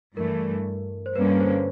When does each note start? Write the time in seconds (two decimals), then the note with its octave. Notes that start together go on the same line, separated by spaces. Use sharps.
0.17 G2 E3 A3 A#4
1.06 C5
1.15 G2 D3 G3 A#3 C#4 B4
1.40 C5